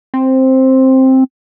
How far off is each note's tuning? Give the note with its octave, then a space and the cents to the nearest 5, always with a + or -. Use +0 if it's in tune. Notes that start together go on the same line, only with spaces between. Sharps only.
C4 +5